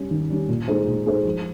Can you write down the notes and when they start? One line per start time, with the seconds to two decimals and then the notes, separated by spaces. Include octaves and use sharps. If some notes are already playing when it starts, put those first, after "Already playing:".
Already playing: G3 C#4
0.11 D#3
0.30 G3 C#4
0.49 A#2
0.68 G#3 D#4 G#4 C5
0.87 A#2
1.06 G#3 D#4 G#4 C5
1.25 F3